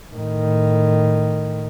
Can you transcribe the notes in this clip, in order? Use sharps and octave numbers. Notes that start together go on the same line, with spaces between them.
A2 D#3